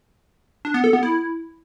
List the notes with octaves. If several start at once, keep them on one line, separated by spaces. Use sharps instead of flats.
D4
B3
A4
B3
E4